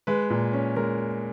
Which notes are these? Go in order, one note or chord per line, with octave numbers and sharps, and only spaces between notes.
G#3 B4
A#2
C#4
G#3 A#4